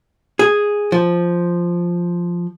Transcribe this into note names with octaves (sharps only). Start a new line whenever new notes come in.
G#4
F3